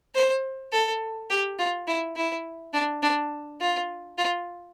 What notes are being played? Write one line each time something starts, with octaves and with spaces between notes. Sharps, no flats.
C5
A4
G4
F4
E4
E4
D4
D4
F4
F4